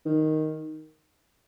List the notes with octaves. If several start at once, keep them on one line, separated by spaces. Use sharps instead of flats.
D#3